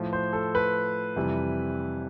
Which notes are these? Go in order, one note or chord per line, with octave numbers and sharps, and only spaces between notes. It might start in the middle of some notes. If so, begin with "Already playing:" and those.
Already playing: A2 F3
C5
A4
B4
F2 C3 E3 G3